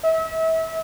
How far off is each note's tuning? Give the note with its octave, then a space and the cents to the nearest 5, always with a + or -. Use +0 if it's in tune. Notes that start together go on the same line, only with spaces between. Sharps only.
E5 -35